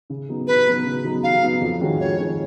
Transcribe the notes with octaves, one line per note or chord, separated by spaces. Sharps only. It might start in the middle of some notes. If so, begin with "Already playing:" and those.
C#3
F#3 B3 D#4
C#3 B4
F#3 B3 D#4
C#3
F#3 B3 D#4
C#3 F5
F#3 B3 D#4
F2
D#3 G#3 C#4 F#4
F2 C#5
D#3 G#3 C#4 F#4